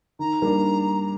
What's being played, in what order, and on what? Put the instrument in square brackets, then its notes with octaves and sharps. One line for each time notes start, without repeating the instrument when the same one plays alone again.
[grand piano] D#3 [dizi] A#5
[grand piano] G3 A#3 D4